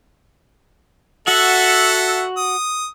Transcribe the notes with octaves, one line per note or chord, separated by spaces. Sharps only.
F#4 A4 E5 F#5
D#6